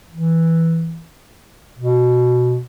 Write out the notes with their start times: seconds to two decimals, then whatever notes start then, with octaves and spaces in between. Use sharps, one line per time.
0.12 E3
1.78 B2